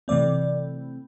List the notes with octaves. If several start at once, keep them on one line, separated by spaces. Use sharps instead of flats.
C3 E3 A3 C4 D5